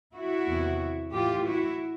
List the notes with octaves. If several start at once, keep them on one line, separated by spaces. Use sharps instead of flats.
E4 F#4
E2 C3 D#3
A2 E3 F4 G4
E4 F#4